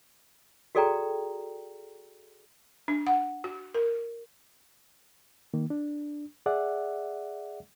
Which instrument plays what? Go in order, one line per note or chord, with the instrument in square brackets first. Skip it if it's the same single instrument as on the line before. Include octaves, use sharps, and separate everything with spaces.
[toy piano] F#4 G#4 A4 D5 G5 A#5
[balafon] D4
F#5
F#4
A#4
[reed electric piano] D#3 A#3
D4
G#4 D5 E5 F#5